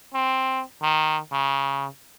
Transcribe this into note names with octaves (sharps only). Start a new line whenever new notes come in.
C4
D#3
C#3